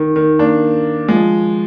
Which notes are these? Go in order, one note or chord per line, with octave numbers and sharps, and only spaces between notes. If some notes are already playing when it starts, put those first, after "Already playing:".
Already playing: D#3
D#3
A#3 D4
F3 G#3